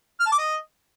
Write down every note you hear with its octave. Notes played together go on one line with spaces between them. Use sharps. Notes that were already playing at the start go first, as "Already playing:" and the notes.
F6
A5
D6
D#5